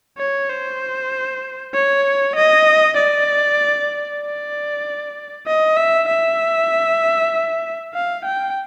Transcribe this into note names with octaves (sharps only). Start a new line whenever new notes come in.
C#5
C5
C#5
D#5
D5
D5
D#5
E5
E5
F5
G5